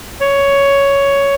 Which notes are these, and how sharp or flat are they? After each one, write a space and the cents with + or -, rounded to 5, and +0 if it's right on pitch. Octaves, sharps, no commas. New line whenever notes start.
C#5 +10